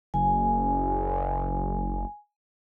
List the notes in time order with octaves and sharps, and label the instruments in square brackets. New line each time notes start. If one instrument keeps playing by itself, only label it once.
[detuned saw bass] F#1 [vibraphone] G#5